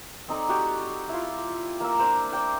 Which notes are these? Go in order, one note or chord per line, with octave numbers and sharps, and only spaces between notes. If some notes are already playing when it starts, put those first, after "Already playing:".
C4 D#4 A4 D5
F#4 G4
E4 F4
A#3 A#5 D6 E6
D4 A#4 C5 E6
D5 G5